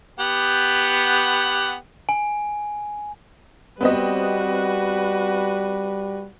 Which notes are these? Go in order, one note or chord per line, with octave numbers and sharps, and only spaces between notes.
B3 G4 F#5
G#5
G3 B3 C4 F#4 B4 D#5